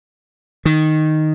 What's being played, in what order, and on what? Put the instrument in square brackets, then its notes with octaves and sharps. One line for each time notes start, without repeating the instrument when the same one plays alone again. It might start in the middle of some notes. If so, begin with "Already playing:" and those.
[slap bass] D#3